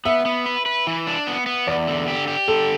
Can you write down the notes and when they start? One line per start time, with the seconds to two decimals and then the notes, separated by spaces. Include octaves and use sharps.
0.05 B3 E5
0.26 B3
0.46 B4
0.66 B4
0.87 E3
1.07 D4
1.27 B3
1.46 B3
1.67 E2 D5
1.88 D3
2.08 G4
2.28 G4
2.48 D3 A4